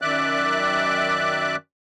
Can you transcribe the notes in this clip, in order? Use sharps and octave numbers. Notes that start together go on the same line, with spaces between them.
F#2 D#3 D5 E5 D6 F#6